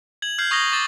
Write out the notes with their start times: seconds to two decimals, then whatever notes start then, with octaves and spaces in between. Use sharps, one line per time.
0.22 G#6 F#7
0.38 F6 G6 G#6 C7
0.51 C#6 D#6 G#6 A#6 F#7 G7
0.73 D6 A6